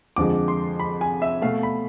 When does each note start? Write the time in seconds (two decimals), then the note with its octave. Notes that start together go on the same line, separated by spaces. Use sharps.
0.16 F2 D3 F3 G#3 D6
0.48 C6
0.79 B5
1.01 G#5
1.22 E5
1.42 B2 A3 F5
1.63 B5